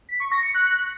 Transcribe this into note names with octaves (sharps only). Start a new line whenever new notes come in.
B6
C#6
A#6
C#7
F#6